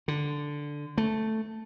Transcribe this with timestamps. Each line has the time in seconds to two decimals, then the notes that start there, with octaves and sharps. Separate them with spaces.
0.08 D3
0.98 A3